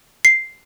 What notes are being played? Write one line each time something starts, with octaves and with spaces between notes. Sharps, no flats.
C7